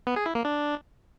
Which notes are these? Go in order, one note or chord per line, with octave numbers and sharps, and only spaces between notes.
B3
G#4
E4
A#3
D4